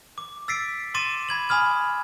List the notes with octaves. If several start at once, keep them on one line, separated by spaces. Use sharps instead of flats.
D6
E6 A6 B6 C7 D7
C6 D6 A6 D#7 E7
B5 G#6 F#7
G#5 B5 D#6 F6 G#6